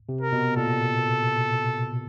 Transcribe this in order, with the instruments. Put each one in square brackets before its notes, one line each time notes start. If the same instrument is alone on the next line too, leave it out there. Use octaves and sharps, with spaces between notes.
[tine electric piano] C3
[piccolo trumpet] A#4
[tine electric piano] B2
[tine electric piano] A#2 [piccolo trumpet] A4